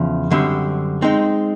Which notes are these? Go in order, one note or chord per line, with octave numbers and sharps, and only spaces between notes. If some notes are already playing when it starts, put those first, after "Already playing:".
Already playing: E2 C#3 F3
F#2 D3 G3 C4
G#3 C4 D#4